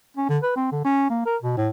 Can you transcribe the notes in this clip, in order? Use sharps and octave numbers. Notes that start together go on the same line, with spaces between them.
C#4
D3
B4
C4
D3
C#4
A#3
A#4
B2
A2